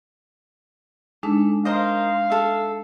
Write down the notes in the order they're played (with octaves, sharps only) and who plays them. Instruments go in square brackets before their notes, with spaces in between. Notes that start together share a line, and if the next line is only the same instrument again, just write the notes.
[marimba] G#3 D4 D#4 [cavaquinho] A4
[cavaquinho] A#4 C5 D#5 [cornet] F5
[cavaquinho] A4 E5